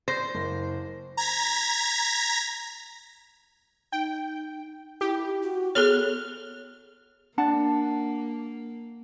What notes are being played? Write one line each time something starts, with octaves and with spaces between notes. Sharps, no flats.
C5 A#6
F#1
A#5 G#6 A#6 B6
D#4 G5
E4 G4
F#4
B3 G#4 A4 C#5 F6
A#3 D4 F#5 A5